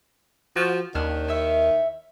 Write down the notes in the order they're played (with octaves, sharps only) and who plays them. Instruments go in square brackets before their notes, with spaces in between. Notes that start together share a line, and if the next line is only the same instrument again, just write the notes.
[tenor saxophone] F3 [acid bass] F#4
[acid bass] D#2 [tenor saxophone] D#3 [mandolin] C#4 D4 F6
[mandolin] E4 C#5 E5